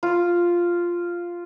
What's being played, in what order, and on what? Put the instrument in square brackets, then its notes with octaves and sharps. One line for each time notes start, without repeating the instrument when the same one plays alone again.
[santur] F4